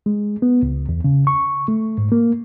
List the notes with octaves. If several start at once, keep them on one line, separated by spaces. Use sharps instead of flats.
G#3
B3
C#2
E2
C#3
C#6
A3
G#2
A#3